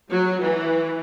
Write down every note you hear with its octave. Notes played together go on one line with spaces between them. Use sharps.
F#3
E3